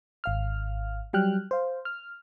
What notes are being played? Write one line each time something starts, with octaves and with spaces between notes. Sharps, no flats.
G#1 F5 F6
F#3 G3 G5 F6 F#6
C5 F5
F6